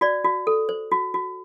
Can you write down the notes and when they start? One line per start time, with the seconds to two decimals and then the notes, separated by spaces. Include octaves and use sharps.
0.01 F#4 D5
0.24 F#4
0.47 A4
0.69 C5
0.91 F#4
1.14 F#4